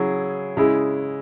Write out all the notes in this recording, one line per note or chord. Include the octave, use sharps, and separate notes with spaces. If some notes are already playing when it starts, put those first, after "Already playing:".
Already playing: C#3 F#3 E4 G#4
C#3 G#3 E4